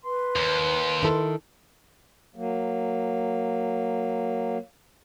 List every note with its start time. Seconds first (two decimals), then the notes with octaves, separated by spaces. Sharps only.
0.04 B4 C6
0.36 D#2
1.03 D#3 E4 A4
2.36 F#3 A#3